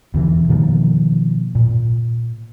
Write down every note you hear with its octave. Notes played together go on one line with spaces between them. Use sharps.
E1 D3 E3
B2 D#3 F3 A#3
A#2